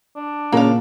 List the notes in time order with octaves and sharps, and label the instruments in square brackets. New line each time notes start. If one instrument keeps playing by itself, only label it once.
[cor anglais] D4
[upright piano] A#2 [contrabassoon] C#3 [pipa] A#3 F5